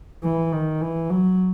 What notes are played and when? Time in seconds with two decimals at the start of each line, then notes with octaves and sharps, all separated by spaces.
0.24 E3
0.53 D#3
0.81 E3
1.10 F#3